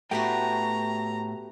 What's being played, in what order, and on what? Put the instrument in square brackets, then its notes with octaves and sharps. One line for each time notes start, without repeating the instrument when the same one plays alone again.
[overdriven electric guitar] A2 [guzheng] A3 B3 F#4 [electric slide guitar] G4 G5 [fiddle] A#5